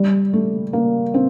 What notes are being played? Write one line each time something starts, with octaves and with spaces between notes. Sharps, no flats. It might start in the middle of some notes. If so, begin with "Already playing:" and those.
Already playing: G3
A3
A#3
C4